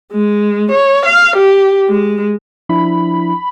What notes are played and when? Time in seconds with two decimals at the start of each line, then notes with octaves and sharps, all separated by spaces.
0.12 G#3
0.71 C#5
1.05 F5
1.36 G4
1.89 G#3
2.69 F3 D4 E4 B5